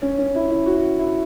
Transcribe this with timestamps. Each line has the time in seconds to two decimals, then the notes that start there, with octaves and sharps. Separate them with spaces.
0.02 C#4
0.18 C#4
0.35 E4
0.50 E4
0.66 F#4
0.99 E4